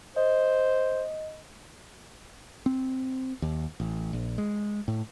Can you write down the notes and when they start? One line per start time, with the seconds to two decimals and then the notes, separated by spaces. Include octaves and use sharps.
0.16 C5 D#5
2.66 C4
3.42 D#2
3.80 A1
4.13 A#1
4.38 G#3
4.88 A2